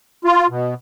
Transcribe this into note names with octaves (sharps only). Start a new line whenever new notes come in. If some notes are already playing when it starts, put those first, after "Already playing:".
F4
B2